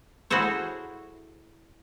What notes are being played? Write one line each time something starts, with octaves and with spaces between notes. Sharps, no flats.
E4 F#4 G#4 A4 C5 C#5